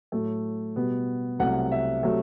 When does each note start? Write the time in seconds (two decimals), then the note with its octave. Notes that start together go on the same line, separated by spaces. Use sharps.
0.12 A2 F#3 A3
0.76 B2 G3 B3
1.39 C2 C3 F#3 A3 F#5
1.72 E5
2.03 C3 F#3 A3